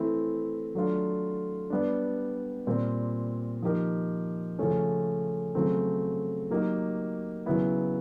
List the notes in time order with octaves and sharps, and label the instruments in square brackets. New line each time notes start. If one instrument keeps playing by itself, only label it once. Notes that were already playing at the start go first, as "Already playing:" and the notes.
Already playing: [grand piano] E3 A3 C4 E4
F#3 A3 D4 F4
G3 B3 D4
A#2 G3 C4
F3 A#3 D#4 G4 A#4
C#3 F3 A3 C#4
C#3 F#3 A3 C4
F#3 A#3 D#4 G4
C#3 F#3 B3 E4